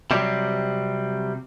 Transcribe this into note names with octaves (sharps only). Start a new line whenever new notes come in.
C3 F#3 G3 C4